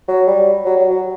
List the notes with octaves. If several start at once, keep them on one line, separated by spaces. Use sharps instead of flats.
F#3
G3
F#3
F#3
F#3